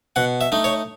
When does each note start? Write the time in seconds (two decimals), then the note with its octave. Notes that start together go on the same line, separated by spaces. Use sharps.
0.16 B2 F#5
0.41 E5
0.52 A3 D#4
0.64 C#5